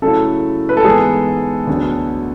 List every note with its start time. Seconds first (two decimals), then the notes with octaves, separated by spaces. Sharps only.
0.02 C#3 F#3 A3 E4 A4
0.69 B4
0.77 A4
0.85 G#2 E3 B3 G#4
1.67 D2 D3 F#3 B3